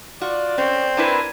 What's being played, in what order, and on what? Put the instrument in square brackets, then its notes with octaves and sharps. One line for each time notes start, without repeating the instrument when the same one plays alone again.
[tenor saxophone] F4 [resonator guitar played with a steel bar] F#4 [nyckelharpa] D5
[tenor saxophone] C4 [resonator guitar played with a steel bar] C#4
[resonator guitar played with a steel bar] D4 E4 B4 [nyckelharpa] A#4 G#5